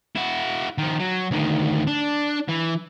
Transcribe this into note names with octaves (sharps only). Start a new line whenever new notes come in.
E4 F#4
D#3 F3
F#3
D2 D#3
D4
E3